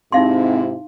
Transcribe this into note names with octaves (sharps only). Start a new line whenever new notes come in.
G#2 C3 C4 D#4 E4 F5 C6